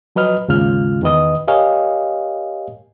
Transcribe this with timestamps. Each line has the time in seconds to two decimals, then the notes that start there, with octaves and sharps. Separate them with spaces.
0.16 F3 F#3 B4 D#5 F6
0.48 D#2 G#2 C#3 G#3 F4 F6
1.02 E2 D#3 B4 D#5 D#6
1.48 G4 A#4 C#5 D#5 F5 G#5